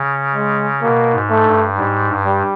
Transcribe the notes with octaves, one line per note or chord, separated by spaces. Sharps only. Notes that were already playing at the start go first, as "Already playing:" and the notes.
Already playing: C#3
G#3
B2 A#3
G#2
A3
G2
G#2 G3
G2
G3